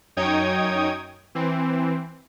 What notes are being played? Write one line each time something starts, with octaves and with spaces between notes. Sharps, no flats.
F#2 D#4 C#5 G5 D#6 G#6
E3 C4